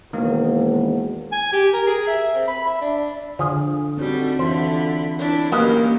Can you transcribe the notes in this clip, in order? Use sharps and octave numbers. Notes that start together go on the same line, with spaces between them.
E1 D#3 G#3 A#3
G#5
G4
A#4
G#4
E5
C4
B5
E5
D4
D3 F3 G#4
G3 C4 D#4 F#4 A4
D3 E3 F4 C5 E5 B5
D4 E4
D#3 A#3 C#4 G4 A#4 B4 D#5 F5